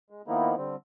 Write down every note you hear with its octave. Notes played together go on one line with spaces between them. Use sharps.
G#3
D#3 F3 A#3 B3 D#4 E4
D3 G3 C4